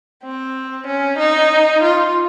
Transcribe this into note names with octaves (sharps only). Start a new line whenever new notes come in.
C4
C#4
D#4
F4